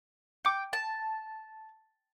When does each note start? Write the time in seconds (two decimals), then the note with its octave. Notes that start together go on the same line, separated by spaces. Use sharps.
0.45 G5 D6 C#7
0.73 A5